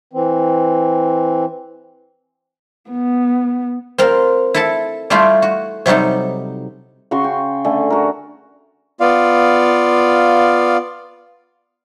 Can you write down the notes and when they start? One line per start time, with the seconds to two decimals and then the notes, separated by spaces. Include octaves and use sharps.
0.13 E3 C4
2.91 B3
3.98 C4 F4 A#4
4.54 E4 A4 A5
5.10 G3 A3 E4 F4 G4
5.42 F#4
5.86 C3 F#3 G3 D#4 A4
7.11 C#3 F#4 C6 C#6
7.24 G5
7.65 D3 A3 G#5
7.90 F#4 A#4
9.00 B3 F4 D5 F5